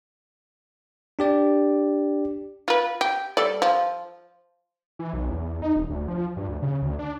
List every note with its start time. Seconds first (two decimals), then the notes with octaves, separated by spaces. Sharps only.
1.19 D4 G4 D5
2.68 F4 B4
3.01 G4
3.37 G3 A4 D5
3.62 F3
4.99 E3
5.13 B1
5.31 E2
5.62 D#4
5.76 D#1
5.90 D2
6.08 F3
6.37 G2
6.49 D2
6.62 C#3
6.82 D2
6.99 D4